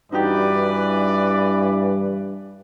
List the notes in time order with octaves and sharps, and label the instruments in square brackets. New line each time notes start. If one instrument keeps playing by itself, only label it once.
[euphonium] G2 [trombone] E3 [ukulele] D#4 F#4 G4 [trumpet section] B4 D5